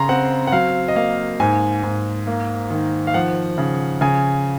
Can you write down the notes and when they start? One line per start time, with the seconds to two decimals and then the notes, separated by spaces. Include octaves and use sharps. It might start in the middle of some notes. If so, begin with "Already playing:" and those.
Already playing: C#3 A#5 C6
0.09 C4 F#5
0.47 F#5
0.52 F#3 F5
0.88 D#5
0.96 A#3 F5
1.40 G#2 G#5
1.83 G#2
2.27 A#3
2.70 D#3
3.07 F5
3.14 F3 F#5
3.58 C#3
4.01 C#3 G#5